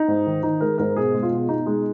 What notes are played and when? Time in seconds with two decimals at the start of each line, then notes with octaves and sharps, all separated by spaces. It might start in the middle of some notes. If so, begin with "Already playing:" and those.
Already playing: D#4
0.08 G#2
0.26 D#3
0.43 D#3 D#4
0.61 G#3 A#4
0.78 G#2 A#4
0.96 B2 G#4
1.14 G#3
1.23 F4
1.32 B2
1.49 B2 D#4
1.66 G#3